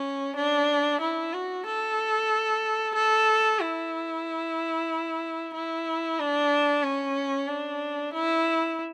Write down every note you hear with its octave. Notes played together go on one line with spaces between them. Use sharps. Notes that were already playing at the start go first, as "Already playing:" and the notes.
Already playing: C#4
D4
E4
F#4
A4
A4
E4
E4
D4
C#4
D4
E4